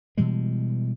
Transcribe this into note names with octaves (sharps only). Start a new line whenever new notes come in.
B2 E3 G3 G#3